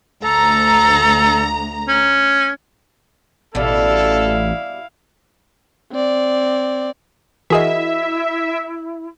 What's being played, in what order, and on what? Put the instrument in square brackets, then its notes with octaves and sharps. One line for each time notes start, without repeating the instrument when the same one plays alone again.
[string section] D2 A#5 [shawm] A4
[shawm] C#4
[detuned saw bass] A1 [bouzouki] B2 G3 [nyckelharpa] E4 F5 [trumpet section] A4
[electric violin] C4 D5
[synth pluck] E3 G#4 C7 [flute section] E4 [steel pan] F#4 A#4 D#5 [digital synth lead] E5